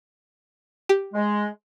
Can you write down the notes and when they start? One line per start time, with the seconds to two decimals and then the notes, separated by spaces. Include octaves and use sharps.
0.89 G4
1.14 G#3